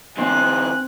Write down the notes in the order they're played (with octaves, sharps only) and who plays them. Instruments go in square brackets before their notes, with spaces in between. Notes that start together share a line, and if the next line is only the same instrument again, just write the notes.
[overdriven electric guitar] D#3 F3 [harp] C4 [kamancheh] G#5 F#6